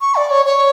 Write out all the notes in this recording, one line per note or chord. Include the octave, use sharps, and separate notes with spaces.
C#6
D5
C#5
C#5